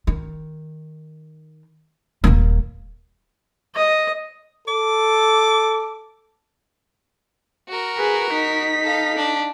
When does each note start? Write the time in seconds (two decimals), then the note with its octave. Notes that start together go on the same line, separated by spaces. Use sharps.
0.07 D#3
2.24 D#1 A#3
3.75 D#5
4.68 A4 D6
7.68 F#4 A#4
7.98 G#4 B4
8.31 D#4 B6
8.82 A4 F5
9.16 D4